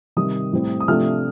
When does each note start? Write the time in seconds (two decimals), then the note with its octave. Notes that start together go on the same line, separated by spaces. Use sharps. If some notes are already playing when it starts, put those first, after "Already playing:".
0.17 C3 D#3 G3 D#6
0.52 A2 G3 C4
0.80 D#6
0.88 C3 F3 A3 D4 F6